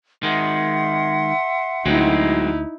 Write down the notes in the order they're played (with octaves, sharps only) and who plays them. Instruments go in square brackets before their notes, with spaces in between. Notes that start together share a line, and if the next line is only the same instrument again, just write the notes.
[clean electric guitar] D#3 G#3 [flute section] E5 F#5 C6
[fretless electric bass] D2 [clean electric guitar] F#3 G#3 C4 [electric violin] D#4 E4